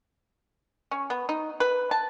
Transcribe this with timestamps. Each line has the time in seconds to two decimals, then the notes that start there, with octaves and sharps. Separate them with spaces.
0.91 C#4
1.10 B3
1.29 D#4
1.60 B4
1.91 A5